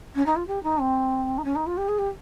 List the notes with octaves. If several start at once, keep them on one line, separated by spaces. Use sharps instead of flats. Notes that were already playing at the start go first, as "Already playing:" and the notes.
C#4
D#4
F4
G4
D#4
C4
D#4
C#4
D#4
F4
G4
G#4
G4